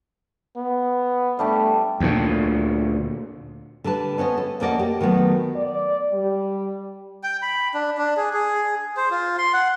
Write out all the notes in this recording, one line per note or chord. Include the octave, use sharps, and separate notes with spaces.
B3
G3 A3 D4 G4
D2 A#2
D3 G3 B4 A5
B3 C#4 C5 D#5
A4
F2 A#3 C#4 D5 D#5 F#5
G4
D#3 F#3 A3 B3
D5
G3
G5
B5
D4
D4
G#4
G#4
C5
F4
C6
F#5